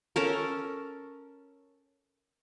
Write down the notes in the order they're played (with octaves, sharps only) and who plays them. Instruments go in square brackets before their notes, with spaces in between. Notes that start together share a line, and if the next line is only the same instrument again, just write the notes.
[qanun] C#4 A4 A#4